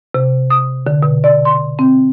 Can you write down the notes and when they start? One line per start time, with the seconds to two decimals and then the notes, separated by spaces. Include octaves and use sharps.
0.14 C3
0.50 D#6
0.87 D3
1.03 B2
1.24 D5
1.45 C6
1.79 C4